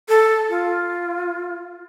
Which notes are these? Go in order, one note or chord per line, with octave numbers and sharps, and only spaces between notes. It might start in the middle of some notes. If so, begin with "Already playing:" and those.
A4
F4